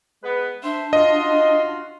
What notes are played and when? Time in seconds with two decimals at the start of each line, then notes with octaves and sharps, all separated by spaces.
0.23 G#3 B3 B4
0.63 D4 C5 E5
0.93 F4 F#4 D#5 C6